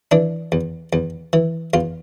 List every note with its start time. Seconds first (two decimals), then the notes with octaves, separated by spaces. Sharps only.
0.11 E3 D4
0.52 E2
0.93 E2
1.33 E3
1.74 E2 F4